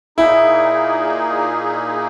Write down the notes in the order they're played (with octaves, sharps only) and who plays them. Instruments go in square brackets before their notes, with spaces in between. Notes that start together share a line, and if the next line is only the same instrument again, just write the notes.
[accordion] A#2 A#3 D#4 G#4 [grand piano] E4